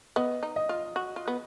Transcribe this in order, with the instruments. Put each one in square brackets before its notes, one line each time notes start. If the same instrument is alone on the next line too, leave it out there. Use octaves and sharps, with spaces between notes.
[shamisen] B3 [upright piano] D#5
[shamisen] D#4
[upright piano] D#5
[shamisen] F4
F#4
F4
B3